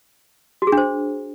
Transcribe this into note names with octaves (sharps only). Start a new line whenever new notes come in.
F#4
G#4
D4
C5